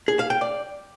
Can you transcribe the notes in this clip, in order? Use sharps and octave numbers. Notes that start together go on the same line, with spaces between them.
G#4
F5
G5
D5